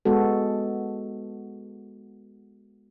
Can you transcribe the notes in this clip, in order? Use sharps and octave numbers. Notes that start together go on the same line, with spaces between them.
G#3 B3 F#4 A4